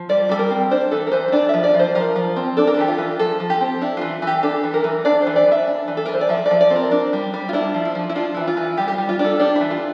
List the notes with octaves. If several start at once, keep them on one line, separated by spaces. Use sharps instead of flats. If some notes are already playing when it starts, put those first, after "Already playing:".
Already playing: F3
G3 D5
G3 A4
A#4
C4
D4 C5
E3 A4
A#4
E3 C5
C5
D4 D5
F3 E5
D5
F3 C5
F3 A#4
F3
C4
D4 A4
A#4
A4
E3 G4
F4
E3
F3 A4
F3
G4
C4
D4 E4
E3 F4
E3
G4
D4 A4
E3
A#4
E3
D4 D5
C5
E3
D5
E3 E5
D4
E3
A4
E3 A#4
C5
D5
F3 E5
D5
F3
D5
C4
A#4
D4
G3
G3
F4
D4 E4
F3
E4
F3
E4
D4 F4
E3 E4
F4
E3
G3 G4
G4
G3 F4
F4
D4
A4
D4 G4
E3 E4
F4